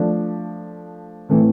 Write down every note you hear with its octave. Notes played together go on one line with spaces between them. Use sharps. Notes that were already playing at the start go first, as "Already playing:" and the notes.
Already playing: F3 A3 D4
A2 E3 A3 C4